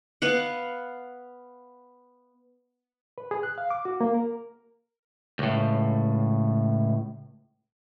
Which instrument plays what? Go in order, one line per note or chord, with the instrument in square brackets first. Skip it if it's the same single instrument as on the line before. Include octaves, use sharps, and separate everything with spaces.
[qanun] B3 F5 F#5
[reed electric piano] B4
G#4
F#6
F5
D6
F#4
A#3
A#4
[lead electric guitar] C#2 A2